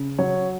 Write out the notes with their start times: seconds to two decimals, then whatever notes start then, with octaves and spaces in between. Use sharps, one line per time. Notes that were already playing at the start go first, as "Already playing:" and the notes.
Already playing: C#3
0.19 F#3 C#5